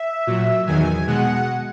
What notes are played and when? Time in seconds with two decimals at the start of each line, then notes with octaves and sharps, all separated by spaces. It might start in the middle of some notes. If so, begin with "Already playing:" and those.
Already playing: E5
0.27 A#2 F#3
0.67 E2 D#3 F#3 G#5
1.07 B2 G#3 F#5